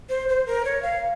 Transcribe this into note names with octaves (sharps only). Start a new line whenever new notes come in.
C5
C5
A#4
C#5
F5